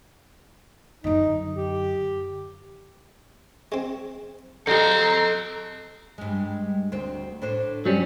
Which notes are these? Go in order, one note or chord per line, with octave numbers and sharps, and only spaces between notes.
F#2 D3 D#4
G4
G#3 C4
D3 C4 G4 A4 D#5 A#5
G2 G#3
D2 C4
A2 D4 C5
G2 F#3 G3 C#4